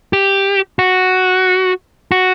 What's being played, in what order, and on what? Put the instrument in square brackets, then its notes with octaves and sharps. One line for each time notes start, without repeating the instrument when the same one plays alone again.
[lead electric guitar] G4
F#4
F#4